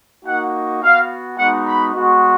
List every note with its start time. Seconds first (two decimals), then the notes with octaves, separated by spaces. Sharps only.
0.25 A#3 D#4 F#4 F#5
0.82 B3 F#4 F5
1.37 G#3 B3 D#4 F#4 F#5
1.65 B5
1.94 G#3 B3 F#4